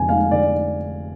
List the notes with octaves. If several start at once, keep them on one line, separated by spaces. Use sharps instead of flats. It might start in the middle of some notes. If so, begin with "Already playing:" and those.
Already playing: F1 F2 D3 G#5
G#3 F5
D3 D5